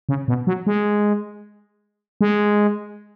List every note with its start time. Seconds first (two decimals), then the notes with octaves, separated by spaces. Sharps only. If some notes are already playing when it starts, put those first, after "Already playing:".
0.09 C#3
0.28 B2
0.47 F#3
0.67 G#3
2.21 G#3